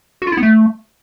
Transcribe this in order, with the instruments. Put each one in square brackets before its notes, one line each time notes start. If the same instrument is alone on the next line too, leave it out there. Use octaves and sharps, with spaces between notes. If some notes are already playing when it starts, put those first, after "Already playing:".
[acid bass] F#4
F4
E4
B3
A3